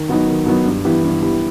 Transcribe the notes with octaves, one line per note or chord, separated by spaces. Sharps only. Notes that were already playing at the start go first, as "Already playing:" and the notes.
Already playing: D#3
F#3 B3 D#4
D#3
F#3 B3 D#4
G2
E3 B3 E4 G4
G2
E3 B3 E4 G4